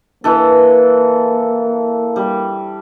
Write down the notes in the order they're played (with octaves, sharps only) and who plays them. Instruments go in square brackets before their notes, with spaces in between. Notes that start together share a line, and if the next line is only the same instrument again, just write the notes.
[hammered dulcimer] E3 A4 [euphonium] A#3
[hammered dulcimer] G3